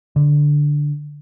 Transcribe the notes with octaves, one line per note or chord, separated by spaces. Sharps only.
D3